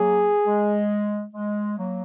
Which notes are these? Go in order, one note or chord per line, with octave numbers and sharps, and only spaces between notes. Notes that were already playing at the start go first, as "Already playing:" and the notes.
Already playing: F#3 A#3 G#4
G#3
G#3
F#3 A#3